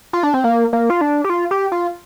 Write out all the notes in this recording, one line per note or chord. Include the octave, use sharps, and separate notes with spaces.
F4
D4
C4
A#3
A#3
F4
D4
G4
F4
G4
F4